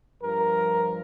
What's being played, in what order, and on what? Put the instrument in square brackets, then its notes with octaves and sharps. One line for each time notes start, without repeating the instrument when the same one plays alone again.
[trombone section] G2 F3 A#4